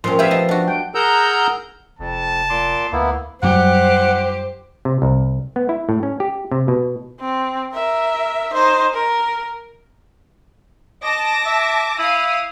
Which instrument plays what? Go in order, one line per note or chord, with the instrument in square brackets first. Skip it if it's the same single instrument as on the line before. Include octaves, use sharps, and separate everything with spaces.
[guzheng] A#2 [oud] F3 C4 C#4 [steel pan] C6
[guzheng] B3 G4 G#4 [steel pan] E5 F5
[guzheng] D#5 A5
D4 F#4
[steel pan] G5
[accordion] G#4 A#4 F#5 A#5 E6 G6
[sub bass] F1 [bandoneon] F2 [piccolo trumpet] A5
[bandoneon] A#2 C6 D6
[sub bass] D2 [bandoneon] A#3 B3 E4
[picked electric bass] F#2 F#3 G3 [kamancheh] G4 [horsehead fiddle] C5 [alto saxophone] F#5
[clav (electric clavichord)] C3
C2
B3
E4
A2
C#4
G4
C3
B2
[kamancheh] C4
A#4 E5
D#4 C5
A#4
[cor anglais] D#5 [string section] A5 D6 A#6
[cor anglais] E5
[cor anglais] E4 [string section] F5 D#6